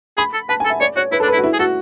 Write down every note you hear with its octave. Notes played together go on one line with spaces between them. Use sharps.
G#4 B5
A4
B4 A5
G#5
A4
E5
C#5 D5
F#4 C#5
E4 B4
A4
D4
B4
E4
F#4
E4
G#4
F#4 A4